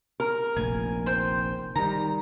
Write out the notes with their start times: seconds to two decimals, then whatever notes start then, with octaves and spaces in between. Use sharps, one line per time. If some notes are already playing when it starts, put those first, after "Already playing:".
0.20 A#4
0.57 F1 A#1 G#5
1.06 C5 G5
1.76 D#3 G3 A#5